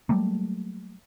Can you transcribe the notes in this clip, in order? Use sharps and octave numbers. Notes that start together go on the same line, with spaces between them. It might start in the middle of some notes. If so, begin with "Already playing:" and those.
F#3 G3 A3 A#3